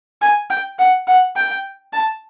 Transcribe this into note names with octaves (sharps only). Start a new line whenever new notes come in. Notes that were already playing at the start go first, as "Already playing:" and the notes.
G#5
G5
F#5
F#5
G5
A5